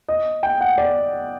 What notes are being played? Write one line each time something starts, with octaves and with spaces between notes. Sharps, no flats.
D#5
G5
F#5
D5